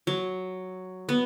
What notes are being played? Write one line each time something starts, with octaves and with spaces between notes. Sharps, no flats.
F#3
B3